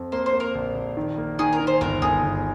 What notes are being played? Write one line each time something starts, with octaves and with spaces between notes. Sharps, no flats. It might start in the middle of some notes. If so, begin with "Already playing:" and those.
Already playing: F2
A#3 C5
C5
A#3
A#4
A#1
A#1
D#3
A#3
D#3 G#4
A#4
D#3
C5
G1 A#4
G1 G#4
G1